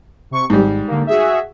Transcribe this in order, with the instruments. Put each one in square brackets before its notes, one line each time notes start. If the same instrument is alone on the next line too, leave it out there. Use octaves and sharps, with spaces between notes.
[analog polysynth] C3 C#6
[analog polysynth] G#1 [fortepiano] G#2 G3
[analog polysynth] D3 A#3
F#4 G#4 E5